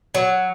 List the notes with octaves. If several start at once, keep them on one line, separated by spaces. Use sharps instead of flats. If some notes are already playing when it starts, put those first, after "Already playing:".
F#3